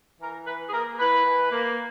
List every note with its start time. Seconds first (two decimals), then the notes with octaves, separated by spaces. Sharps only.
0.21 E3 A#4
0.47 E3 B4
0.69 G#4
0.73 A#3 A#4
0.99 E4 B4
1.26 E3
1.52 A#3